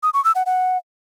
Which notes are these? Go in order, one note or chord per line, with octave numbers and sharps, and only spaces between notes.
D#6
C#6
E6
F#5
F#5